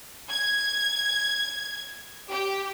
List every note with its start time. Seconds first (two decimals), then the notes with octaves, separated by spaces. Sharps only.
0.29 G#6
2.30 G4